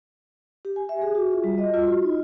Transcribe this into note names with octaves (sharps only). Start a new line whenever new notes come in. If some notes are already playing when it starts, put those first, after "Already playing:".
G4
G#5
E5
G#4
F#4
F4
G3
D#5
F4
F#4
D#4